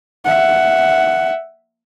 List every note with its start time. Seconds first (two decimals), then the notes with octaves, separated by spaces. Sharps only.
0.25 E5 F#5